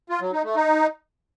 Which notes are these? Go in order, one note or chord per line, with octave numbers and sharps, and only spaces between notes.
F4
F#3
D#4
A3
D#4